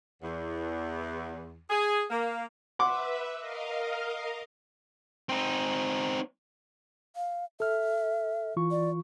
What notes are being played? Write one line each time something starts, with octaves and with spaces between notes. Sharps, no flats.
E2
G#4
A#3
B4 E5 F#5 C6 D6
A#4 D#5 F5
C4 D#4
F5
A4 E5 F6
E3 F4 C#6
D5